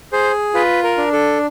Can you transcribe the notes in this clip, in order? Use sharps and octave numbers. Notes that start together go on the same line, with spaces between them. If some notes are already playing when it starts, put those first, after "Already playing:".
G#4 C5
F4 B4
A#4
D4
A4